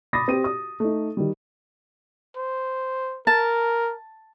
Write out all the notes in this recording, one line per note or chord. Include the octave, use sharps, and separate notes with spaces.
B5 D6 D#6 A6 A#6
C4 G4 D#7
D#6
A3 D#4
D#3 G3
C5
A#4 A5